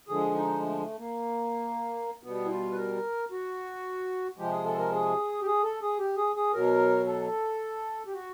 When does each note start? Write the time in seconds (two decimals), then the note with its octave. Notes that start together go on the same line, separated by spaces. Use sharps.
0.08 D3 F3 G#3 G#4
0.35 D#4
0.62 A3
0.80 A3
0.98 A#3
2.23 B2 G3 B3
2.45 E4
2.50 F4
2.72 B4
2.77 A#4
3.31 F#4
4.38 C3 F3 G#3 G4
4.52 G#4
4.65 A4
4.78 A#4
4.92 G#4
5.42 G4
5.46 G#4
5.63 A4
5.82 G#4
5.99 G4
6.17 G#4
6.36 G#4
6.53 B2 F#3 A#4
7.06 A4
8.07 G4
8.13 F#4